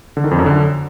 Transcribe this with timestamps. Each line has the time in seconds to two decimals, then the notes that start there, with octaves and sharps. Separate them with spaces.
0.17 D3
0.24 D#3
0.31 F2
0.39 F#2
0.46 D3